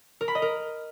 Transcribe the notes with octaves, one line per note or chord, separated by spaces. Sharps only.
A#4
B5
D#5
A#4